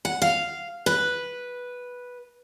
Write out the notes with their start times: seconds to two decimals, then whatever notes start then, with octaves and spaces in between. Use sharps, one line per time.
0.05 F#5
0.22 F5
0.86 B4